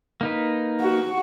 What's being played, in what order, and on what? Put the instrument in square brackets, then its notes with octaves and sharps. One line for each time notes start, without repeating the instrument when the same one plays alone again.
[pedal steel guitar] A#3 D#4 B4
[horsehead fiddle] F#4